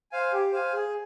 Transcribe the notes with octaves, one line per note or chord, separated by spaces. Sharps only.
C5 F5 G#5
G4
C5 F5 G#5
G#4